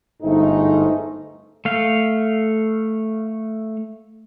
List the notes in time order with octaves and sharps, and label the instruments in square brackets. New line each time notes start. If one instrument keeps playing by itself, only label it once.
[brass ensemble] G1 G#2 A3 D#4
[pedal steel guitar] A3 F5